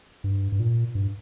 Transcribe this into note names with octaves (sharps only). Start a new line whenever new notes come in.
G2
G2
A#2
G2